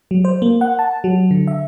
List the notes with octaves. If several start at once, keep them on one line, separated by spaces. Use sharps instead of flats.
F#3
C5
A#3
F#5
A5
F#3
D3
E5